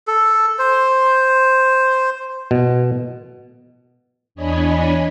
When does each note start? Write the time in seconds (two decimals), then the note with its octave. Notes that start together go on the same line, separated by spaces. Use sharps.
0.08 A4
0.59 C5
2.51 B2
4.35 E2 D4 C#5 D#5 G#5 B5